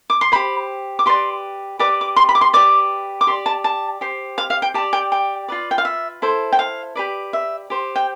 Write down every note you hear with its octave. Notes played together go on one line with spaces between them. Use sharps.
D6
C6
G4 C5 B5
D6
G4 B4 D5 C6
G4 B4 D5 D6
D6
C6
B5
D6
C6
G4 B4 D5 D6
D6
G4 D5 C6
A5
A5
G4 C5
F5
F5
G5
G4 D5 A5
G5
G5
F4 B4 D5
G5
F5
E5
E4 A4 C5
G5
F5
G4 B4 D5
E5
G4 C5
G5